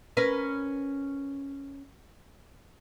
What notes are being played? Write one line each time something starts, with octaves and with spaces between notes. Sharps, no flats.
C#4 A#4 B4